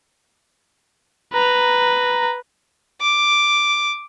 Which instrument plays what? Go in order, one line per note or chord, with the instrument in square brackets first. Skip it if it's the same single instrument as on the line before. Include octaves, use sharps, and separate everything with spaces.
[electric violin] B4 [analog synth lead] A#5
[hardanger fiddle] D6